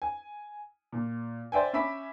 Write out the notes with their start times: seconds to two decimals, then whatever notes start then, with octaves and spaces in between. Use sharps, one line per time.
0.02 G#5
0.93 A#2
1.52 C5 D5 E5 G5 G#5
1.73 C#4 E5 B5 D6 B6